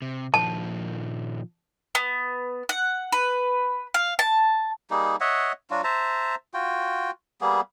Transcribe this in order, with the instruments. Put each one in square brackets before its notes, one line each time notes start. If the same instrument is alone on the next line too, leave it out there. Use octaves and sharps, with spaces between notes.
[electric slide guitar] C3
[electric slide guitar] A#2 D#3 F3 [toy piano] A5
[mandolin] B3
F#5
B4
F5
A5
[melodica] G3 A#3 D#4 G#4
C#5 D#5 E5 F#5
F#3 D4 F4 F#4
C5 E5 A5 A#5
F4 F#4 G5
G3 A#3 B3 G#4